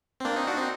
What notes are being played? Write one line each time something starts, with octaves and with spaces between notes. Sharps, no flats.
C4
A#3 D4
C4 D#4
D4 F#4
C4 D#4